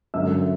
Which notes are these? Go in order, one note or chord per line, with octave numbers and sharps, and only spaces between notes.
G1 F#2 D3 F#3 E5 E6